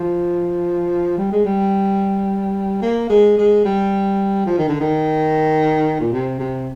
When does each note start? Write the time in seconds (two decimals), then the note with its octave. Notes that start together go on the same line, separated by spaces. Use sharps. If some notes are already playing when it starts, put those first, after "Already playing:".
Already playing: F3
1.18 G3
1.32 G#3
1.45 G3
2.82 A#3
3.10 G#3
3.37 G#3
3.65 G3
4.47 F3
4.58 D#3
4.69 D3
4.80 D#3
6.01 A#2
6.12 C3
6.39 C3